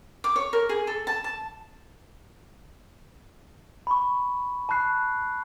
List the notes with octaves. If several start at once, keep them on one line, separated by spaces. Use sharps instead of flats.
D6
C#5
A#4
G#4
A4
A5
A5
B5 C#6
A5 B5 C#6 F#6 C7